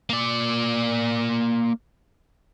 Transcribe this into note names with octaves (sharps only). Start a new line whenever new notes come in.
A#3 D5